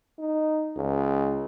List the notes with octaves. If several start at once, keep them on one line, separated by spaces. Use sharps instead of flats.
D#4
C#2